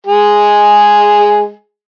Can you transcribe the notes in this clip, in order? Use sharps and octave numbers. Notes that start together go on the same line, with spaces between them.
G#3 G#4